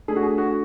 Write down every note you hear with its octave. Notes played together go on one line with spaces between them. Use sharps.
A3 D4 G#4 A4
F#4
G#4
F#4